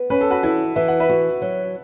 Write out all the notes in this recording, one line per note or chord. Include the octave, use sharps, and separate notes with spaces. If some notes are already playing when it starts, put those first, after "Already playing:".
Already playing: B3
C#4 B4
A4
F#4 B4
E3 E4 A4
E3 E5
F#5
B4 E5
F#4
F#3